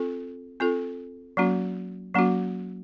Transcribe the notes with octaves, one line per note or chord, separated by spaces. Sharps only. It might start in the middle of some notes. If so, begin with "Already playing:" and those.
Already playing: C4 F4 A4
C4 F4 A4
F#3 A#3 C#4 F#4
F#3 A#3 C#4 F#4